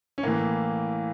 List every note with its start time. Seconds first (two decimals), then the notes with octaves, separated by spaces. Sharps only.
0.18 C#4
0.23 A2 E3 A#3